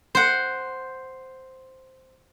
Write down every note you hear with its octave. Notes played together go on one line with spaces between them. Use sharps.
C5 F#5